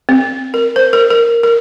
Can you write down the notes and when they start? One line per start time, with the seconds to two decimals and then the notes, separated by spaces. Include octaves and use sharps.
0.09 C4
0.54 A#4
0.76 C5
0.93 A#4
1.10 A#4
1.43 A#4